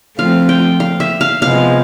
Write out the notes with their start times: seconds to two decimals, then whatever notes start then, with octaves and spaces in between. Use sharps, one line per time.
0.18 F3 A3 C4 F4 F5
0.49 G5
0.80 F5
1.00 E5
1.21 F5
1.42 C3 F3 G#3 B3 F5